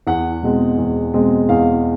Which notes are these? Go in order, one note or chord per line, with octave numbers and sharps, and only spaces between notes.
E2 F#5
B2 G#3 C4
E2
B2 G#3 C4
E2 F5